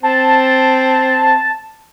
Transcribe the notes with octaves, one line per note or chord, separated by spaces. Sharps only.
C4 A5